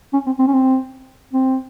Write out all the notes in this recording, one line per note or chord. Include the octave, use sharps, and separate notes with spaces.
C#4
C4
C4
C#4
C4
C4